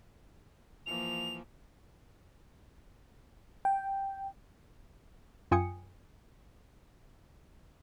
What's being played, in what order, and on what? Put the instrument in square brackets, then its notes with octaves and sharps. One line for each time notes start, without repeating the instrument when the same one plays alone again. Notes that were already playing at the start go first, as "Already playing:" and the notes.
[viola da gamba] E3 F3 A#3 [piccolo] F7
[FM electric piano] G5
[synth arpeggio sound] F#2 F4 G5 G#5 D#6 C#7